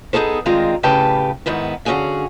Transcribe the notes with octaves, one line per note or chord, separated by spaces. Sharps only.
B3 D#4 G#4 A4 C5
G2 D#3 G#3 C4 F4 A#5
A2 C#3 G4 B4 G5 A5
G#2 D#3 B3 E4
D3 C#4 D4 F#4 G#4 F5